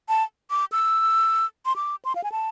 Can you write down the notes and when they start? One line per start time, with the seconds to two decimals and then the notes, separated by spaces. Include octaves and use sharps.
0.09 A5
0.50 D6
0.72 E6
1.66 C6
1.76 D6
2.05 C6
2.15 F5
2.24 G#5
2.32 A5